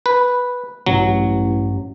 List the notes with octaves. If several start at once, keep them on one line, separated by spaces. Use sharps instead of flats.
B4
A1 G2 F#3